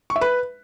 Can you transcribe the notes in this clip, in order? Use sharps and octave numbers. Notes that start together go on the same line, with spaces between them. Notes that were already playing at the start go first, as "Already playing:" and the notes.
C#6
E5
B4